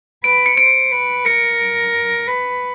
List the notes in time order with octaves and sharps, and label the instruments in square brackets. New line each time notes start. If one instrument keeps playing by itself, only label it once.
[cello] B4 [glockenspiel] D7
[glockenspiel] C#7
[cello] C5 [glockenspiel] D7
[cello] B4
[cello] A#4 [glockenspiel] C#7
[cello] B4